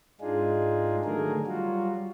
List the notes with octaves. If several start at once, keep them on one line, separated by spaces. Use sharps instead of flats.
G#2 G#3 D4 D#4 F4 G#4
D3 D#3 F#3 A3 G#4 A#4
F#3 G3 F4 F#4